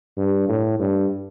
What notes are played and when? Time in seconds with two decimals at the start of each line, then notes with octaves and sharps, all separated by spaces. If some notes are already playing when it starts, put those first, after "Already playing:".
0.17 G2
0.49 A2
0.79 G2